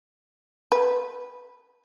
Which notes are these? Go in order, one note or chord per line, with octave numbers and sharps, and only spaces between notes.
B4